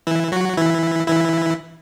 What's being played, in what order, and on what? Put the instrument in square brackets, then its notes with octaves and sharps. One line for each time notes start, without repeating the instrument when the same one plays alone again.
[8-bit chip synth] E3 E4
F#3 F#4
E3 E4
E3 E4